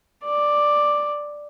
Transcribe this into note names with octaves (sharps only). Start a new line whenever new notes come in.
D5